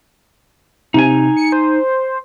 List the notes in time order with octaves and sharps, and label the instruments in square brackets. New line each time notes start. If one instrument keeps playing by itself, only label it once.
[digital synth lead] C3 [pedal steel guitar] D#4 G#5
[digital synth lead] C#7
C5